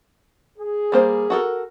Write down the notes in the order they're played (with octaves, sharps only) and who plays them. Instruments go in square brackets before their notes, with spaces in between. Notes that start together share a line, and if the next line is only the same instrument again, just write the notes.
[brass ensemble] G#4
[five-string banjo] G3 A#3 C5
F#4 A4 A#4